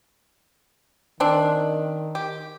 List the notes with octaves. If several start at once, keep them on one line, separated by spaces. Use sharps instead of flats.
D#3 C4 D4
G4